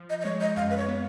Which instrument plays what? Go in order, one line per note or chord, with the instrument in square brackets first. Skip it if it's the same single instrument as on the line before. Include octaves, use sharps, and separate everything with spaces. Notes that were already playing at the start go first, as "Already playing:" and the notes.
Already playing: [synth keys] F3
[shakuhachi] D#5
D#5
[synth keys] G#3 [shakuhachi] C#5
[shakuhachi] D#5
[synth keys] F#2 [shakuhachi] F5
[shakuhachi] B4
C#5
[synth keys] B3